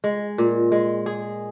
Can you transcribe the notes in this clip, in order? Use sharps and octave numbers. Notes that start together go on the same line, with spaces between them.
G#3
A#2
G#3
G#4